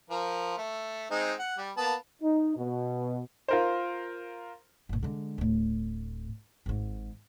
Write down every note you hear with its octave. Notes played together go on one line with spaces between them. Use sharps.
F3 A#4
A3
G#3 C4 D#4
F#5
G3
A#3 B3 A5
D#4
B2
F4 A#4 C5
G1 A#2
D3 G#3
D1 A2
G#1 G#2